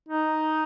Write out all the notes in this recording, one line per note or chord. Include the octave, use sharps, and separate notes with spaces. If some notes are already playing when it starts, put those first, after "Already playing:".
D#4